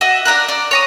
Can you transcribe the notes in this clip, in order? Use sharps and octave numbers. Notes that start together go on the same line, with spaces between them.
F#4 D#5 E5
D4 E5 A#5 F#6
D5
C#5 A#5 D#6